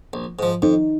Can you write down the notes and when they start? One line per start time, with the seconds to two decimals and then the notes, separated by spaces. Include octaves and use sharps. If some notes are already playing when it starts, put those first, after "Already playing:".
0.13 A#1
0.39 G#2 F3
0.62 F2 D#4